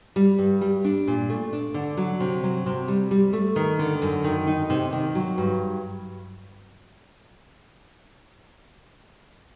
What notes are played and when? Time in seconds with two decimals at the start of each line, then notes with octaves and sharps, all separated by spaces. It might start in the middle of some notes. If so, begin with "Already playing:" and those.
0.16 G3
0.39 G2
0.61 G3
0.84 D4
1.07 A#2
1.29 A3
1.53 D4
1.74 D3
1.97 F#3
2.20 C3
2.43 F#3
2.66 C3
2.88 G3
3.11 G3
3.33 A3
3.56 D#3
3.79 D3
4.02 F#2
4.24 D#3
4.47 D#4
4.70 C3
4.93 D#3
5.15 F#3
5.38 G2